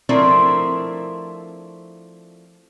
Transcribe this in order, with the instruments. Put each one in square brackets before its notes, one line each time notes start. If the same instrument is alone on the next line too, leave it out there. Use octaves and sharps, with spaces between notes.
[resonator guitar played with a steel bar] F3 A3 C4 D4 E4 A#4